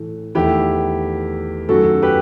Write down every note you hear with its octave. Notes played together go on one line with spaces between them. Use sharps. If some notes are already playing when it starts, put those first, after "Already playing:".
Already playing: A2 E3 A3
E2 D#3 A3 E4 G4
F#2 D#3 A3 F#4 A4
G4 B4